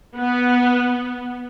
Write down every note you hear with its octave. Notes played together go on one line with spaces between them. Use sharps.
B3